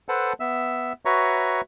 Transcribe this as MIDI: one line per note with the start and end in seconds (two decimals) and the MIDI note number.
0.09 0.33 69
0.09 0.33 71
0.09 0.33 72
0.09 0.33 78
0.09 0.33 81
0.40 0.93 59
0.40 0.93 76
0.40 0.93 88
1.05 1.61 66
1.05 1.61 71
1.05 1.61 73
1.05 1.61 76
1.05 1.61 82
1.05 1.61 85